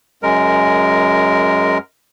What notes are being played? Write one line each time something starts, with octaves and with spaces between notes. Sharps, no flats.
F#2 G#3 A#4